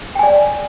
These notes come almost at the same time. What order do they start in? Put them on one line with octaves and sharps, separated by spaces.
G5 G#5 D5 C#5